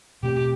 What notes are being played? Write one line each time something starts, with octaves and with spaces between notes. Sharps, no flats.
B2 A3 C4 G4